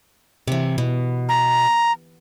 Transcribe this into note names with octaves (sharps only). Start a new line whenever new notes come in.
C3 E3
B2
A#5